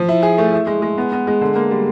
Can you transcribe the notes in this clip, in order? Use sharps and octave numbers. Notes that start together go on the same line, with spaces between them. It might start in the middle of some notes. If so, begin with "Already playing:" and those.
Already playing: F3
E4
G#4
A3
E4
G#3
G#3
B3
B3
G#3
D3
A#3
G3